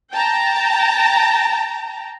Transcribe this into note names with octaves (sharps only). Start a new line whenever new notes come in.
G5 A5 A#5